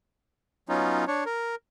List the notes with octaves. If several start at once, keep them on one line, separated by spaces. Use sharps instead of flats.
F#3 B3 C#4 D#4 F4
D4 C#5
A#4